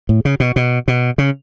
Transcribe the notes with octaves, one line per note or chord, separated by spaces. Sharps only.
A2
C#3
B2
B2
B2
C#3